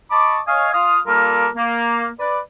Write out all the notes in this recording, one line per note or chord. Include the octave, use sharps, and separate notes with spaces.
D#5 A5 B5 C#6 D6
C#5 D#5 F5 G#5
F4 F5 D#6
G3 A#3 F4 A4 A#4
A#3
B4 D5